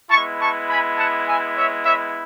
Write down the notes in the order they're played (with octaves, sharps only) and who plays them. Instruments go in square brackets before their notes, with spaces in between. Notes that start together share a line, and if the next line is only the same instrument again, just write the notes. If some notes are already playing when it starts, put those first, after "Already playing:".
[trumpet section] G#3 B3 E4 A5 C#6
A5 C#6
G#5 B5
F#5 A5
E5 G#5
C#5 E5
C#5 E5